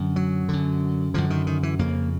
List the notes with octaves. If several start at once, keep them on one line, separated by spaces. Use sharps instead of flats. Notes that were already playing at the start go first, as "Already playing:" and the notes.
Already playing: F#2 D3
F#3
F#2 D3
F#2 D3 F3
D#3
D#3
E3
F2 C#3 A#3